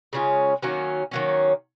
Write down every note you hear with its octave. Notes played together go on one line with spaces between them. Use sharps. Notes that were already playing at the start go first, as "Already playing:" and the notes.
C#3 G#3 C#4 F4
D#3 F#3 A#3 C#4
D#3 F#3 A#3 C#4